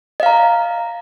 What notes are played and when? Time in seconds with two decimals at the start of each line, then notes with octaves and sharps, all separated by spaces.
0.20 D#5
0.23 F5
0.26 A#5